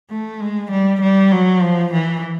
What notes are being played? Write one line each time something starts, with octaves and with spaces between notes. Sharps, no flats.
A3
G#3
G3
G3
F#3
F3
E3